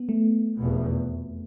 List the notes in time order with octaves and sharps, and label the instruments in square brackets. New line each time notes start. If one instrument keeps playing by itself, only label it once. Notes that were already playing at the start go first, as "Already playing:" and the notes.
Already playing: [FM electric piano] B3
A3
[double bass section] F1 E2 B2